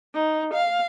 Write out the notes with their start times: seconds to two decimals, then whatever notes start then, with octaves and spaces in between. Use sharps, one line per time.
0.14 D#4
0.54 F5